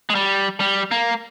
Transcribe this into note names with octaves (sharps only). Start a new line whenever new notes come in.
G#3
G3
G3
A#3